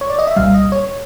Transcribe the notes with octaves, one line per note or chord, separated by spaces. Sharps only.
C#5
D5
D#5
E5
C2 A#2 G3 F5
D#5
C#5